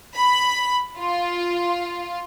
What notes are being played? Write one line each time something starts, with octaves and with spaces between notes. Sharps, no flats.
B5
F4